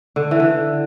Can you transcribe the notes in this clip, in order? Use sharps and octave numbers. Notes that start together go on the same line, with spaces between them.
D3
E3
D3